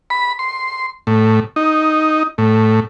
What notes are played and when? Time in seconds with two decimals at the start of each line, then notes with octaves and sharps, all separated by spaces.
0.10 B5
0.39 C6
1.07 A2
1.56 D#4
2.38 A2